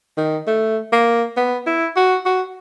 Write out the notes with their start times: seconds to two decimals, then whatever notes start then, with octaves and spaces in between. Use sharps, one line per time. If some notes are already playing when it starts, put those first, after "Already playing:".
0.17 D#3
0.47 A3
0.93 A#3
1.37 B3
1.67 E4
1.96 F#4
2.26 F#4